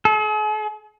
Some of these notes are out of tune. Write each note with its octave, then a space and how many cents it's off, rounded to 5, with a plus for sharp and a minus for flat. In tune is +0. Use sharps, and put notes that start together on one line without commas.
G#4 +45